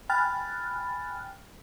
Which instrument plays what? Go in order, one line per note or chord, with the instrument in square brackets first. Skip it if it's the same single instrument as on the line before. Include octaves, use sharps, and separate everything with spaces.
[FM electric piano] G5 G#5 B5 F6 F#6 A6